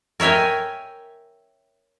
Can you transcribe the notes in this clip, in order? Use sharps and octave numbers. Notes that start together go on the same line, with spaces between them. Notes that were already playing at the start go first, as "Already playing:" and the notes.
A#4 C#5 E5 G5 G#5